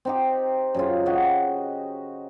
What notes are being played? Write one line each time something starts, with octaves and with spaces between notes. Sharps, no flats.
C4 D#4 G4
F#2 C#3 F4
F#4 G4 D#5